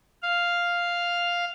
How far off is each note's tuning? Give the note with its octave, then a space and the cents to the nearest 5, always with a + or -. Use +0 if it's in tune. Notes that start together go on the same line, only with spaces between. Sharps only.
F5 +0